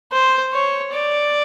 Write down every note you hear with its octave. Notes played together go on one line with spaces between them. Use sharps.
C5
C#5
D5